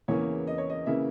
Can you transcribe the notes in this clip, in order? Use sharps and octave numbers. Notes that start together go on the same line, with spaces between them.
E2 C#3 E3 A#3 C#4 C#5
D#5
C#5
D#5
C#3 E3 A#3 C#4 E5